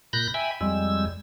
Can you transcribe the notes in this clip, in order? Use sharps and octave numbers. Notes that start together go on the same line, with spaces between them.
A#2 B5 F#6 G6 A#6
E5 G5 G#5 B5
F2 G3 G#3 E6